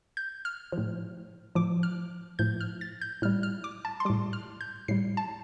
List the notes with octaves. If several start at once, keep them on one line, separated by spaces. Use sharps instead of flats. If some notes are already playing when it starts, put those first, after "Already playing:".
G6
F6
F3
A2
A2 F3 D6
F6
A2 F3 G6
F6
A6
G6
A2 G3 F6
F6
D6
A5
C6
A2 G3 D6
F6
G6
A2 G3 C7
A5